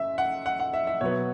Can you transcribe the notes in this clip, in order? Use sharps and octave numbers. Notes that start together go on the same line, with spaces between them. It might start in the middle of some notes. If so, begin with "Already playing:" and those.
Already playing: F#2 E5
F#5
F#5
F#5
E5
E5
B2 F#3 B3 C#5